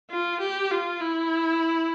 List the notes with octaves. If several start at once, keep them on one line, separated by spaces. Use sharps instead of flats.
F4
G4
F4
E4